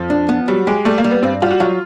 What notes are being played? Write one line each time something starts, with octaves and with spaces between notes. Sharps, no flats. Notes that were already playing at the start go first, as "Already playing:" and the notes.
Already playing: F2 F3
D4
B3
F#3 G3
G#3 G4
G3 A3
A#3
G3
B3
G2 C4
G3 F4
F#4
F#3 F4